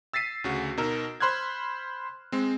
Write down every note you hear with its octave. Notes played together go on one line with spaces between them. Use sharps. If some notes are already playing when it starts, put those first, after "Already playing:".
E6 A6 B6 C7 D#7
D2 C#3 F#4
B2 D#4 A#4 E6
C5 B5 C6 F6 F#6 G#6
G#3 C4